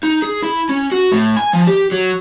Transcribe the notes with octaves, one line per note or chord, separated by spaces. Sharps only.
D#4
G#4
E4
C#4
F#4
A2
G#5
F3
G4
F#3